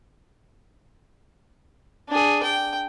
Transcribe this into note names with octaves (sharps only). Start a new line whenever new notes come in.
D4 G#4
G5